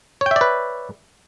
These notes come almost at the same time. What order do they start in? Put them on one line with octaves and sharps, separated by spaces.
C#5 G5 E5 D5 B4